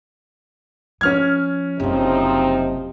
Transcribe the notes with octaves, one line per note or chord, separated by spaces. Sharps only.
F3 C#4 F6 G#6
F#1 F#2 C3 F3 C4 D#4